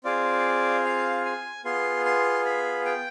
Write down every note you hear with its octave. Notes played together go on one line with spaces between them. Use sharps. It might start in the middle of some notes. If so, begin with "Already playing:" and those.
C4 F4 G#4 D5
F5
G#5
B3 F4 G#4 C6
C6
B5
G5